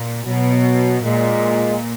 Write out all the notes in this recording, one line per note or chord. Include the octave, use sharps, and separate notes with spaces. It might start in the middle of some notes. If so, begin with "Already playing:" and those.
Already playing: A#2
B2 F#3
A#2 G#3